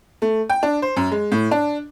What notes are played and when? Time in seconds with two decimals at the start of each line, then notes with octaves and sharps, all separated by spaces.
0.22 A3
0.49 G5
0.63 D4
0.82 C5
0.96 F#2
1.12 G#3
1.32 A2
1.51 D4